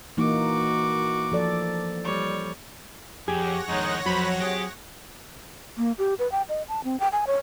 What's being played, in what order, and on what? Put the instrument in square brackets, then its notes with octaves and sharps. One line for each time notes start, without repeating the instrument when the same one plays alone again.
[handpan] E3 A#3 D#4 [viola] F#4 D6
[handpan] F3 A4 D5
[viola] G3 C#5
[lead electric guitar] F2 [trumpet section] G4 [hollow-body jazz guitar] G#4 [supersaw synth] C#5 F#5 A#6
[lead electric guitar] F2 D#3 [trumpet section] G#3 D#4
[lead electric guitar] F2 [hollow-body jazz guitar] F#3 [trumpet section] C5 B5
[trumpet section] C4 G#4 [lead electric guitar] G4
[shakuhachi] A#3
G4
B4
G5
D#5
A5
C4
G5
G#5
C#5